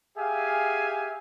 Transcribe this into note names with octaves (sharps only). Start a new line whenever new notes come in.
G4 G#4 E5 F5 G#5